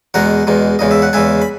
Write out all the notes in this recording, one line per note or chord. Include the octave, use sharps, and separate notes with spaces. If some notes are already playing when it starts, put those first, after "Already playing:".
E2 B2 G#3 F#5 A#5
E2 B2 G#3
E2 C#3 G#3 D#5
E5
F#5
E2 C#3 G#3 E5 G#5
B5